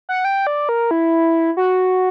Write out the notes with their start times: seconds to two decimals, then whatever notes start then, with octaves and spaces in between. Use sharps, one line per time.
0.09 F#5
0.25 G5
0.47 D5
0.69 A#4
0.91 E4
1.57 F#4